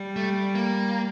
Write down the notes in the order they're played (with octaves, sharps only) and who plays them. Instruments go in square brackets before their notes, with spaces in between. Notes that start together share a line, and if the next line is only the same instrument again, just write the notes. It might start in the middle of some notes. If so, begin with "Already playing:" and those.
Already playing: [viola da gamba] G3
[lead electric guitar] A3
A#3